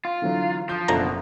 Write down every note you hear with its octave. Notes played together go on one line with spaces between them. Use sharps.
F4
D3 E3 F#3
F3 G6
F#1 B2 D3 F3 E5 A#5